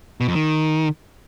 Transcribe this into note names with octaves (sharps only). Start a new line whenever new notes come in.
B2
F2
D#3